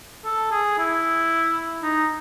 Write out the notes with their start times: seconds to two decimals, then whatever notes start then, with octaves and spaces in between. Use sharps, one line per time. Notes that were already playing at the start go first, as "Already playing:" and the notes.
0.25 A4
0.51 G#4
0.78 E4
1.83 D#4